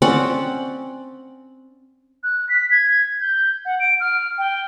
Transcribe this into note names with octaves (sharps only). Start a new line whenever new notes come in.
C4 C#4 D5 F#5
F#6
B6
G#6
G6
F#5
D7
F6
G5